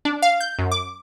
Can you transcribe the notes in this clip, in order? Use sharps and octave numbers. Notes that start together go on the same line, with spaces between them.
D4
F5
G6
F#2
D6